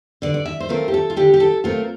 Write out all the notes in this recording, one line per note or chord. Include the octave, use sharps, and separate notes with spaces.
D3 D5
D5
E5
C5
A3 C4 F4 A#4
G4
A4
F4
D3 G4
G4
A4
A3 C4 F4 A#4